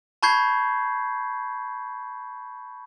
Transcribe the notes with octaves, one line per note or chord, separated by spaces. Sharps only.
A5 B5 C#6 G6 G#6 C7